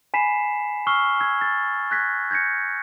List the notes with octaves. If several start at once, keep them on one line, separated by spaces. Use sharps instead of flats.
G#5 B5 B6 C7 E7
C#6 E6 F6 C7 G7
E6 G#6
A6
F#6 G#6 A#6 B6
G6 G#6 A#6 C#7